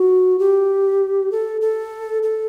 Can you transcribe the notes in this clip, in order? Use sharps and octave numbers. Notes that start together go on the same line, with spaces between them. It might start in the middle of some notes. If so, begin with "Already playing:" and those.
Already playing: F#4
G4
A4
A4
A4